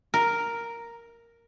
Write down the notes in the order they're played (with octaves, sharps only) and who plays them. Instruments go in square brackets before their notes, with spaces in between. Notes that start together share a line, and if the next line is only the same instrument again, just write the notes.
[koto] A#4